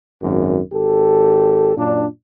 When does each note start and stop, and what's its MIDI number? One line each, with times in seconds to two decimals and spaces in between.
0.22 0.58 32
0.22 0.58 42
0.72 1.74 32
0.72 1.74 67
0.72 1.74 69
1.75 2.04 42
1.75 2.04 46
1.75 2.04 62